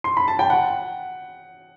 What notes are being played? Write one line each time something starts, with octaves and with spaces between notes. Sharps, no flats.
C6
B5
A5
G5
F#5